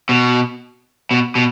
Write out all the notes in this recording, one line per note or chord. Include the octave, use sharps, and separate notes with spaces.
B2
B2
B2